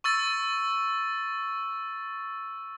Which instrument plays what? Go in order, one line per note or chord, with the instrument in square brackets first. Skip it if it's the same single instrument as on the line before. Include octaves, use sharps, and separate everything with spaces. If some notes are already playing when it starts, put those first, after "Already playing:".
[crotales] C#6 E6 A6